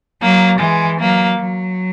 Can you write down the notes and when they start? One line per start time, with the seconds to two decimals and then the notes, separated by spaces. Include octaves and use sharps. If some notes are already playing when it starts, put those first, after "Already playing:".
0.22 F#3 A#3
0.60 E3 G#3
0.99 F#3 A#3
1.39 F#3